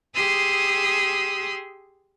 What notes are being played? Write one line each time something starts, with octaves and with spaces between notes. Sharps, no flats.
G4 G#4 C6 D#6 E6